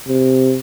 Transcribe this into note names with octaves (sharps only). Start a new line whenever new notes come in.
C3